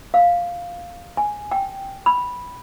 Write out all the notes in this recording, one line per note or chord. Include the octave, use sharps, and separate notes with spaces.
F5
G#5
G5
B5